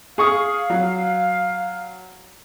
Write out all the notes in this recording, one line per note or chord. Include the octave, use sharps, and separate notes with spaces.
G#4 F5 C#6 D#6
F#3